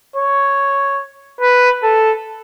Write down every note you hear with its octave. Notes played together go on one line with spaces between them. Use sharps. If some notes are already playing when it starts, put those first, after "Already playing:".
C#5
B4
A4